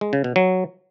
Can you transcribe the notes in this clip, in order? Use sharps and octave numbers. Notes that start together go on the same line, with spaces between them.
G#3
C#3
B2
F#3